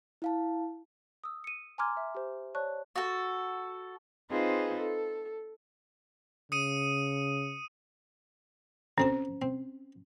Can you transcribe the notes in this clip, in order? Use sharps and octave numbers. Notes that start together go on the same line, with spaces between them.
E4 F5 A5
D#6 E6
C#7 D#7
G#5 A#5 C6 D6 F6 G#6
E5
G4 C5
C#5 D5 A5 C#6 F#6
F#4 A4
C4 D#4 F4 G#4 B4 C5
A4
C#3 D#6 C#7 D#7
D2 C4 C#4 C5 A5
C4